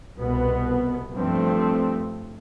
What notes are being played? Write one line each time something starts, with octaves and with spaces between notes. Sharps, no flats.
C2 B2 B3
G2 F3 A3 C4